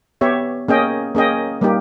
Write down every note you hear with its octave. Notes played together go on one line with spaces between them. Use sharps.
B3 G4 C#5 E5
A#3 C#4 G#4 D#5 G5
A#3 C#4 G#4 D#5 G5
G3 A#3 D#4 G4